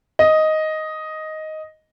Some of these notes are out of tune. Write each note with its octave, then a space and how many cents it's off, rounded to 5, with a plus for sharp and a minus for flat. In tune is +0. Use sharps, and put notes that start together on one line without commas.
D#5 +5